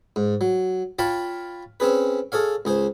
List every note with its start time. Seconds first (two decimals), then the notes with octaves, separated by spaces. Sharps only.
0.16 G#2
0.41 F#3
0.99 F4 C#5 F5 G5 A5 B5
1.80 C4 C#4 G#4 B4
2.32 G#4 A4 C#5 F5
2.65 C#2 G#4 C5